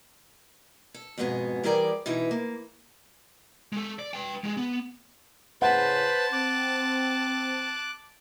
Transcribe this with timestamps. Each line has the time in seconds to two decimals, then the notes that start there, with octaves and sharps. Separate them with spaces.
0.94 A4
1.18 F2 G#2 B2 B3 G#4
1.63 E3 G3 G4 G#4 A#4 D5
2.06 B2 E3 D#4 E4
2.31 A#3
3.72 G#3 A4
3.99 D5
4.14 B4 G5
4.44 G#3 G#4
4.57 B3
5.62 A2 C#3 B4 C5 F#5 A5 B5
6.33 C4 D6 F#6